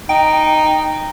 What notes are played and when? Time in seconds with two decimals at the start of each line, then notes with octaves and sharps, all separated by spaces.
0.09 D#4 G5